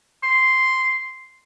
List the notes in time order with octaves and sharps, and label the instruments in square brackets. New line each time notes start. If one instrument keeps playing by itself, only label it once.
[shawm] C6